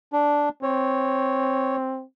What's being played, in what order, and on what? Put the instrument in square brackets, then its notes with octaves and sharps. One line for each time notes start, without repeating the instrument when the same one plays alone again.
[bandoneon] D4
[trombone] C4 [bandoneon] C#5